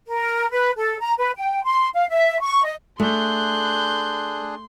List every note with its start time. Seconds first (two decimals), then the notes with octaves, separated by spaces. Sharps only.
0.07 A#4
0.51 B4
0.77 A4
0.99 A#5
1.18 B4
1.37 G5
1.64 C6
1.94 F5
2.08 E5
2.40 C#6
2.64 D#5
3.00 A3 D4 G#4 C6 F#6 G6